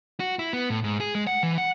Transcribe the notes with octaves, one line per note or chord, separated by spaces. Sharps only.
F#4
E4
B3
A2
G#2
G#4
G#3
F#5
E3
F#5